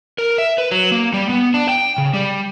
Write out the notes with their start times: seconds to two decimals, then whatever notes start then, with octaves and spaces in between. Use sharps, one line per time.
0.18 A#4
0.38 E5
0.58 B4
0.71 F#3
0.92 A#3
1.14 G3
1.29 B3
1.54 D4
1.69 G5
1.98 C#3
2.14 G3